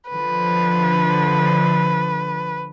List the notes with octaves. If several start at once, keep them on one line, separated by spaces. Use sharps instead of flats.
D3 F3 B4